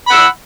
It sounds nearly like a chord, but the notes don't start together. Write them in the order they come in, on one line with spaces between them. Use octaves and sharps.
B5 F#5 E6